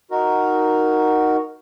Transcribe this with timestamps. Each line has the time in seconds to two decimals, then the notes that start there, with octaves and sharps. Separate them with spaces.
0.11 D#4 F#4 A#4